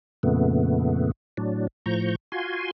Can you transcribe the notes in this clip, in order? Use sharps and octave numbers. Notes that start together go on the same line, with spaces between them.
F2 A#2 C#3 A3 B3
A2 F#3 D4
A2 F3 A#5 C#6 G6
F4 F#4 G#5 C6